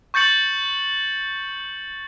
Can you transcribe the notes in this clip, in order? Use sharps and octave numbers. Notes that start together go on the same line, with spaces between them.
C#6 G6 A6 C#7 F#7